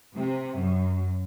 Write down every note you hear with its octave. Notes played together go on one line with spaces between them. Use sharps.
C3
F#2